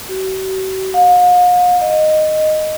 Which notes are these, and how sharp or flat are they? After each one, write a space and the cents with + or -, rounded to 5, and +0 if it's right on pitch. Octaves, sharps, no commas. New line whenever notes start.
F#4 +45
F5 +45
D#5 -10